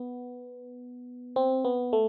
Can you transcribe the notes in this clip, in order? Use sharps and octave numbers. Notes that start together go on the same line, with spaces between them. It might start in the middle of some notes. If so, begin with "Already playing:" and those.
Already playing: B3
C4
B3
A3